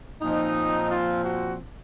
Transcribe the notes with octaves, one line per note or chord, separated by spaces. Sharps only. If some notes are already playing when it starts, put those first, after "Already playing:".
A#2 F3 C4 D#4
F4
F#4